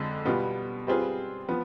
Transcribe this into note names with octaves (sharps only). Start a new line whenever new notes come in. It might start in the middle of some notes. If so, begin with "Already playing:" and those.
Already playing: F2 D3 F3 G#3
B2 G3 B3 F4
G3 C4 F4 G#4 B4
F3 B3